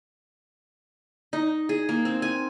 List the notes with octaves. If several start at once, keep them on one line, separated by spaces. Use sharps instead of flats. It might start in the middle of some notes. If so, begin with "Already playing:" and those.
D#4
G#4
A#3
C4
G#5